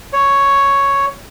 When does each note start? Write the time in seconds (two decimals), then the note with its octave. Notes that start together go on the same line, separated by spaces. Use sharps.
0.13 C#5